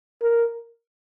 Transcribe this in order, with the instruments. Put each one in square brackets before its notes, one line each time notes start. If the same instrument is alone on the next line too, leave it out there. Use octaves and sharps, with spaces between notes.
[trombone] A#4